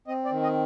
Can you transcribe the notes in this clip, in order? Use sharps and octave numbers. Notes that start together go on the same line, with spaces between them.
C4 D#5
D5
D#3
D#5